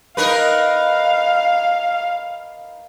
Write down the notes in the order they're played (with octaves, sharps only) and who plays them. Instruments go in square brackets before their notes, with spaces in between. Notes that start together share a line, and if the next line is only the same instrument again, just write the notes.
[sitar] D#4 A#4 B4 [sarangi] F5